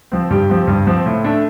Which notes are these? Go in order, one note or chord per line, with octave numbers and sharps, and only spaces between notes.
F3 C4
G2 G4
F3 C4
G2
F3 C4
A2
A3 D4